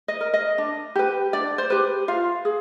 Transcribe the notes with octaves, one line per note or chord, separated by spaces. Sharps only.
D#5
A#4
D#5
D4
G4 B4
D4 D5
C5
G4 B4
F4 F5
G#4